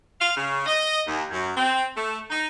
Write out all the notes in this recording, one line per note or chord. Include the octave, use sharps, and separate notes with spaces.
F5
C#3
D#5
D#2
F#2
C4
A3
D#4